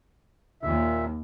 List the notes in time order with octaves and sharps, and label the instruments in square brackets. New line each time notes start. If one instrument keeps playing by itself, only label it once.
[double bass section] D#2 [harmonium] A#2 E5